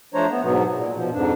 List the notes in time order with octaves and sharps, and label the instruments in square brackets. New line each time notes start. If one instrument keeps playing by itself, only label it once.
[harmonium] F3 A3 D4 C5 C#5 A#5
B3
G#2 B2 F#3 B3
A#2
B2 F3
F2 G#2 D4